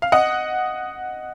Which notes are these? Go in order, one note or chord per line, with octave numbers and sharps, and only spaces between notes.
F5
D#5 F#5